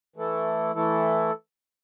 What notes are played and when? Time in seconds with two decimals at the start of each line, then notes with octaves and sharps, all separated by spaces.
0.16 E3 A3 E4 A4
0.75 E3 A3 E4 A4